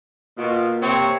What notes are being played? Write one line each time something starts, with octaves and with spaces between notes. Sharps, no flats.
B2 A#3 F4
C3 C4 C#5